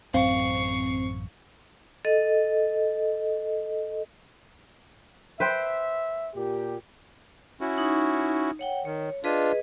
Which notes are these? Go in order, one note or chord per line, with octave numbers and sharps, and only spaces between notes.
A1 F#2 C4 F5 C#6 C7
A4 D#5
B4 C5 E5 G5
A#2 G4
C#4 E4 F#4
D#4
C#5 F#5 G5
D#3 C#5
D4 F4 G#4 B4 D#5